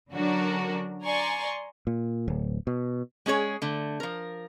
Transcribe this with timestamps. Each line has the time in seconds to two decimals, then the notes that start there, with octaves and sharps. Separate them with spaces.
0.11 D3 F#3 C#4 D4 F#4 A#4
1.04 D5 G#5 A#5 C6 C#6
1.87 A#2
2.28 D1
2.67 B2
3.26 G#3 C#4 G#4 C#5
3.62 D3 A3
4.00 F3 A#4